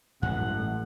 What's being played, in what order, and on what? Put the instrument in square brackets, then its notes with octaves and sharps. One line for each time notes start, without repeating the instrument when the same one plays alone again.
[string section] A1 [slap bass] G2 F#3 G#3 [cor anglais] F#5